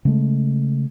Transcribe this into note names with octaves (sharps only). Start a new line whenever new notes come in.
C#3 G#3 A3